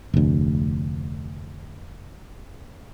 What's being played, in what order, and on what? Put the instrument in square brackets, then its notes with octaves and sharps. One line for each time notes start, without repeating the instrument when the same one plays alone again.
[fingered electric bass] F1 D2